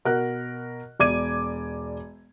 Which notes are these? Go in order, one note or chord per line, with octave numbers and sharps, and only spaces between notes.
B2 A#4 F#5 F#6
E1 D5 D6 G#6 D#7